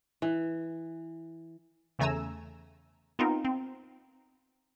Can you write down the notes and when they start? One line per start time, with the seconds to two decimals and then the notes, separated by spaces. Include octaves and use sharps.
0.22 E3
1.99 E2 C#3 A3 G#5 A#5 E6
3.19 B3 C4 D#4 F4 A#4
3.45 C4